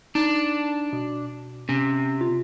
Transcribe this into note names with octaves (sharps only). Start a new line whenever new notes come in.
D4 D#4
B2
C3 C#4
F4